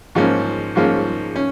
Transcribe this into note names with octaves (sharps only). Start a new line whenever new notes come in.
G#2 F3 A#3 C#4
G#2 F3 A#3 C#4
C#4